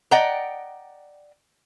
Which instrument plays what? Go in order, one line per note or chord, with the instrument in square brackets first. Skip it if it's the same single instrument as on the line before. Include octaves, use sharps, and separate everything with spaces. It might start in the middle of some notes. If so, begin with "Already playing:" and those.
[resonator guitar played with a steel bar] D5 D#5 F#5 G5 A#5